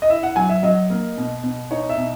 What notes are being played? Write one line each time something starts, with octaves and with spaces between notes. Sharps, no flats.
D#5
E4 E5
F#5
F#3 G#5
E5
F#3 D#5
A#3
B2
B2
D#4 C#5
E5
B2